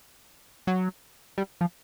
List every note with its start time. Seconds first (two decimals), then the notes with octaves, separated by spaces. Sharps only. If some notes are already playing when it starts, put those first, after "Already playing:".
0.67 F#3
1.38 G3
1.61 F3